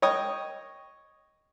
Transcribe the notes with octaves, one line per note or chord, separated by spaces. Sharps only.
C#5 D#5 G5 D#6